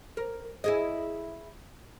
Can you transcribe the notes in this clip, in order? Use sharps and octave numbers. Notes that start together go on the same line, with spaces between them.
A#4
E4 G#4 D#5